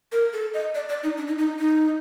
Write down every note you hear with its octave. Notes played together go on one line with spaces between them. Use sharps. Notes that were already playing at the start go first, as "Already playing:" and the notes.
A#4
A4
D#5
D5
D5
D#4
D4
D#4
D#4
D#4